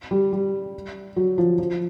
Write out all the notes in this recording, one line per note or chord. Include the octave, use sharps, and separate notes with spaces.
G3
G3
F#3
F3
F3